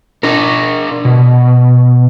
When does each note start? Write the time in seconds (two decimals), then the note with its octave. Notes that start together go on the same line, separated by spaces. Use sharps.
0.23 D4 A#4
1.05 B2